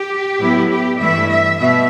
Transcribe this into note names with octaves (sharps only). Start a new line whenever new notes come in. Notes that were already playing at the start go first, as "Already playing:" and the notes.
Already playing: G4
A2 F#3 B3 E4
G4
G2 E3 A3 E4 E5
E5
B2 E5